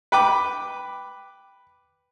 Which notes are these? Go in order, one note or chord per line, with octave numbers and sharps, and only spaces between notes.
B4 G5 D6